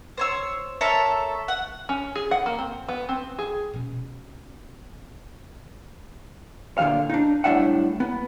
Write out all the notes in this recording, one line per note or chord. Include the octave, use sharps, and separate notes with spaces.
C5 C#5 E6
A4 A#4 C#5 E5
F#5
C#4
G#4
F#5
A#3
C4
B3
C4
G#4
B2 C#4
A#2 D3 E3 F#4 F5
D4 D#4
B1 A2 G3 D4 E5 F#5
B3